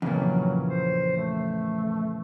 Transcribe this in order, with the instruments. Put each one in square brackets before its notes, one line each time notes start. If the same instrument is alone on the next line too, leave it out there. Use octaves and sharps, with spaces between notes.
[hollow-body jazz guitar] F2 [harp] A#2 C#3 E3 [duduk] F#3
[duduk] C5
A3